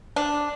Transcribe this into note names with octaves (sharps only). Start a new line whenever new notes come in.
D4